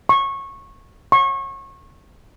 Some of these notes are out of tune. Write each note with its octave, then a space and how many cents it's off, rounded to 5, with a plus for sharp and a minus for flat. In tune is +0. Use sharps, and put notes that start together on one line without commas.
C#6 -15
C#6 -25